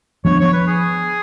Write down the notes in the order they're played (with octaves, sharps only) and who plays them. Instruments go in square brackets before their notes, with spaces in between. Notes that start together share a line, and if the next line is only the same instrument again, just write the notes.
[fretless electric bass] F3 B3 D4 [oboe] C#5
[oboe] C#5
B4
G#4